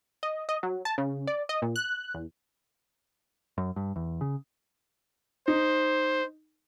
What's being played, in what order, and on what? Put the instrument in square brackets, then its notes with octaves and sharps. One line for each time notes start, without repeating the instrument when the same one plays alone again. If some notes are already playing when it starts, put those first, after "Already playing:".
[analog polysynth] D#5
D#5
F#3
A5
C#3
D5
D#5
A#2
F#6
E2
[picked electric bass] F#2
G2
E2
C#3
[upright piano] D#4 [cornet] C5